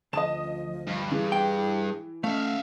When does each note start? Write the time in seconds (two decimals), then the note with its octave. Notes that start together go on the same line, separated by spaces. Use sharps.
0.13 D2 F3 D#5 A5 D#6 E7
0.87 G2
1.12 E3 G#4
1.32 G5
2.24 A3 C#4 E5 F5